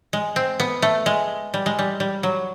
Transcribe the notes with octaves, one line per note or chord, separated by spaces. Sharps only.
G#3
C4
B3
A3
G#3
G3
G#3
G3
G3
F#3